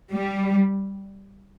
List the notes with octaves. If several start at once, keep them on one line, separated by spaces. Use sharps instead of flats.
G3